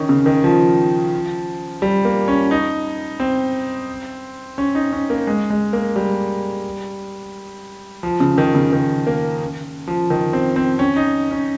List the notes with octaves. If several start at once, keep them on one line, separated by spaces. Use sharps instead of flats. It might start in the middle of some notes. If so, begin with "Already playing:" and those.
Already playing: D#3 C#4
C#3
D#3
F3
G3
A#3
C#4
D#4
C4
C#4
D#4
C#4
A#3
G#3
G#3
A#3
G3
F3
C#3
D#3
C#3
D#3
A#3
F3
D#3
C4
C4
C#4
D#4
C#4